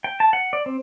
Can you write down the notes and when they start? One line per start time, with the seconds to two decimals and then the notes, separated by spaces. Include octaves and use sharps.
0.04 G5
0.20 A5
0.33 F#5
0.53 D5
0.66 C4